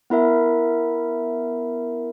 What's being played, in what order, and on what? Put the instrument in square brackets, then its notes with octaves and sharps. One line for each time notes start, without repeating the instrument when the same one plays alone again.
[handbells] B3 E4 A#4 E5